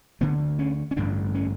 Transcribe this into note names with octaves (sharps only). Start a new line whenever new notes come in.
D2 D3 B3
C#4
C#4
A1 G2 D3 D4
C#4